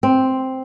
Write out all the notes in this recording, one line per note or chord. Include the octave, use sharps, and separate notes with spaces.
C4